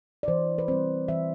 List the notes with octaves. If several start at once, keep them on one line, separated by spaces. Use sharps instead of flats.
D5
E3 C5
B4
G3 C4 C5
E3 E5